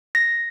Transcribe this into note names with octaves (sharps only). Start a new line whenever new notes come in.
A#6